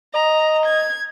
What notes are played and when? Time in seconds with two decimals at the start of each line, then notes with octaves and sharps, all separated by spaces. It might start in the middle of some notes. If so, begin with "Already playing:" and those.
0.14 D#5 A#5
0.65 G#6